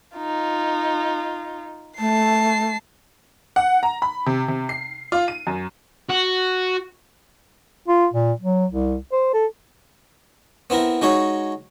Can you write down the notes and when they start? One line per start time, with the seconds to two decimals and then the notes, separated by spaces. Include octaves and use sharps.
0.17 D#4 F4
1.99 A3 A5 C7
3.56 F#5
3.83 A#5
4.02 B5
4.26 C3
4.48 C3
4.69 C7
5.12 F4
5.28 D#7
5.47 F#2
6.10 F#4
7.88 F4
8.13 A#2
8.40 F#3
8.71 C2
9.12 C5
9.34 A4
10.70 B3 C4 E4 A#4
11.02 G#3 D#4 F#4 C#5